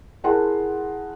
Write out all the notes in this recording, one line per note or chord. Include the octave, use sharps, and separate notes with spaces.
E4 G#4 A#4 F#5 A5 C6